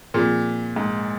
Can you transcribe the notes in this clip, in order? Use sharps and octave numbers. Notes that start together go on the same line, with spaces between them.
A#2 F3 C4 F4 G#4
G#2